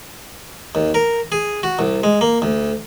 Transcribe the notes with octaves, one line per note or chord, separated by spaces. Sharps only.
D#2
A#4
G#4
F#4
C2
G#3
A#3
D2